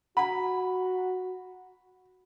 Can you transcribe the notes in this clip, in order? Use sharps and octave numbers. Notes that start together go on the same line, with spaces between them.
F#4 F#5 A#5 B5